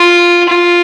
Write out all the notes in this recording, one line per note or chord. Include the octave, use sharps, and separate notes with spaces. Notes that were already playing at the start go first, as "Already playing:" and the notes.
Already playing: F4
F4